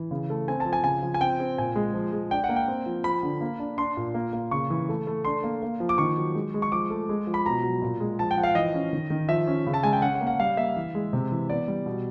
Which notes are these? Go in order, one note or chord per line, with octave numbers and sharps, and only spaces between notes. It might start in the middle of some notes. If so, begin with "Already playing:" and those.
Already playing: E3
C#3
A3
C4 G#5
A5
F3
G#5
C#3 G#5
F3
G#5
C4 G5
C4
A#2 G#5
G#3
F3
G#3
D4 G5
F#5
A#3
G5
C4
F3
F3 B5
D3
A#3
D4
D4 C6
A#2
A#3
A#3
C#3 C#6
E3
A3
A3
D4 C6
A#3
A#3
F3
D6
D#3 C#6
F#3
G#3
G#3
C#6
F3 D6
A3
G#3
F3
B5
B2 A#5
F#3
A#2
G#3
F3 A5
G5
F3 F#5
F5
E3 D#5
C#4
D#3
D#3
F3 E5
C#4
C#3
A5
G#3 G#5
G5
C#4 F#5
F#5
A#3
F#5
G3 F5
A#3 E5
E3
G#3
C3
E3
B3 D5
G3
B2